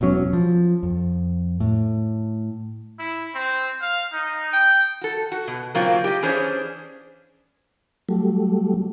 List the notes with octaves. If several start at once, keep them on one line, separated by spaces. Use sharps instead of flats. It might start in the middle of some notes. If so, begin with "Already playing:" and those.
E1 E2 F#3 C#4
F3
F2
A2
E4
C4
F5
D#4
G5
F#4 A4
F#4
B2
C#3 F#3 A#3 C4 F4
G4 D#5
E3 C#4 D4 G#4 C5 C#5
F#3 G3 A3